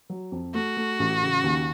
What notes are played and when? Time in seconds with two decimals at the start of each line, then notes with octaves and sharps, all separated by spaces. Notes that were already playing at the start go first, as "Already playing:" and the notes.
0.09 F#3
0.32 F2
0.54 A3 F#4
0.77 A3
0.99 A1
1.22 C#3
1.44 D#2